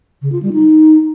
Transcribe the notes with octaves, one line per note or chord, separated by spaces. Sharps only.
C#3
F4
G3
D#4